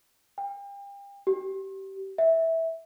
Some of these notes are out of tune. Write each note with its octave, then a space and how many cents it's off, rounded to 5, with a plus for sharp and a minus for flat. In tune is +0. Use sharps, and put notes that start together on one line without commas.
G5 +35
G4 -25
E5 -15